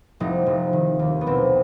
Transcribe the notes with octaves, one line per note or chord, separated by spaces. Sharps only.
F1 D#4
F1
D#3
D#2
B3
B1 C4